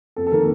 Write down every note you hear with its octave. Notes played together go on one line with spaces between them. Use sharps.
F2 A4
A4
D#3 A#3 A#4